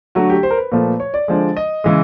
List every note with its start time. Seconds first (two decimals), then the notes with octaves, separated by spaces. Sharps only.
0.15 D3 F#3 A3 F#4
0.30 G4
0.43 C5
0.51 A#4
0.58 B4
0.72 A#2 F3 A3
1.00 C#5
1.14 D5
1.28 D3 F3 G#3
1.57 D#5
1.84 C#3 E3 G#3